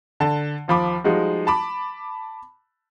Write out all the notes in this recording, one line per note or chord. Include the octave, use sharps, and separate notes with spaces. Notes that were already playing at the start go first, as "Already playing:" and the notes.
D3 A5
D#2 F3 B5 D6
F3 G3 G#3 D#4 F#4
A5 B5 D6